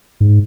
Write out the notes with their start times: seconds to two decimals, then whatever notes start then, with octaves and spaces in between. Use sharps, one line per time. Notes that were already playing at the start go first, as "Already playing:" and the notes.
0.20 G#2